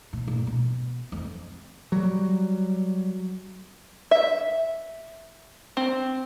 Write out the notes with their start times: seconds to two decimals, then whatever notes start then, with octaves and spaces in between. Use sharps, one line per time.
0.13 A#2
0.28 A#2
0.47 B2
1.12 F2
1.92 F#3 G3
4.11 E5
5.77 C4